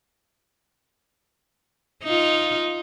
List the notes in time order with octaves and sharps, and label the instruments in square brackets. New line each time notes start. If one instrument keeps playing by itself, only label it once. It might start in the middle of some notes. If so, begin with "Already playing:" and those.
[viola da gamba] D#4 F4